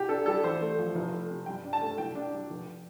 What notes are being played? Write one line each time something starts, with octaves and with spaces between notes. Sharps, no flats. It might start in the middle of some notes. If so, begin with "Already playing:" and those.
Already playing: C2 G4
D4 A4
G3 A4
A1 C5
A3
F3
F1
A3
C3
G2 G5
D4
A5
A3
C2 G5
D4
G3
F1